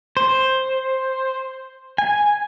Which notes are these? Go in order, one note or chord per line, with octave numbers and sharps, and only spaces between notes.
C5
G#5